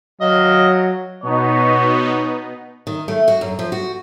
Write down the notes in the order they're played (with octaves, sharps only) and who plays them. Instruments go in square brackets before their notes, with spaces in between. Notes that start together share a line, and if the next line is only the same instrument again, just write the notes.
[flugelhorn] F#3 [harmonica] D#5 F5
[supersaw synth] B2 B3 D#4 [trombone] C#5
[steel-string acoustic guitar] D#3
A3
F#4
F#2
F3
F#4